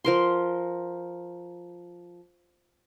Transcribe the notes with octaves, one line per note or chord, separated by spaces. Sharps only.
F3 A#4 C6